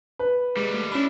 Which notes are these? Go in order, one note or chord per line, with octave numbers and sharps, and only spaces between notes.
B4
D#2 G3 G#3
A3
C#4 D4 E4 B5